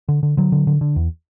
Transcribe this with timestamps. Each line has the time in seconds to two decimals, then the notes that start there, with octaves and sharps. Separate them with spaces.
0.09 D3
0.23 D3
0.37 D3 F#3
0.52 D3
0.67 D3
0.81 D3
0.96 E2